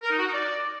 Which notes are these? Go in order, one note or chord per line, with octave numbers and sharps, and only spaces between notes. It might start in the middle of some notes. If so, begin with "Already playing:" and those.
A#4
D#4
F#4
D#4
D5